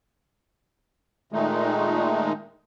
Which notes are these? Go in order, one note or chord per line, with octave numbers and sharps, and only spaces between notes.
A#2 D#3 G#3 A3 D#4